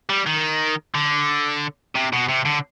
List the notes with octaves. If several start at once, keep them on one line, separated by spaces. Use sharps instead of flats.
G3
D#3
D3
C3
B2
C3
D3